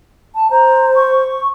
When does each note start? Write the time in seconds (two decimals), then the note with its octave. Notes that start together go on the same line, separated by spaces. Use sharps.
0.35 A5
0.51 C5 A#5
0.96 C#6